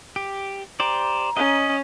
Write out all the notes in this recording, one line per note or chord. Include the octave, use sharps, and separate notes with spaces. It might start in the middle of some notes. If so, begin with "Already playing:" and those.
G4
G4 C5 D5 A#5
C#4 D#5